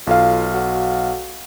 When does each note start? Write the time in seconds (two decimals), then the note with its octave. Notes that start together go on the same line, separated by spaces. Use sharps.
0.07 B1 F4 A4 F5
0.54 F#4